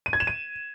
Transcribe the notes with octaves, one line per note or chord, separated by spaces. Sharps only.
D#7
G#6
E7
D#7